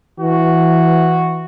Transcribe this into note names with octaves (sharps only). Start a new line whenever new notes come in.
E3 F#4